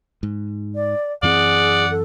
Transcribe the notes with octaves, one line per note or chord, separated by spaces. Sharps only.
G#2
D5
F#2 E3 C4 G#4 D5 F#5
A4